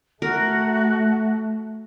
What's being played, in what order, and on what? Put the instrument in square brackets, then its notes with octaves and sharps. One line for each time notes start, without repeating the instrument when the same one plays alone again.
[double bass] A3 [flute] F#4 [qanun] A#4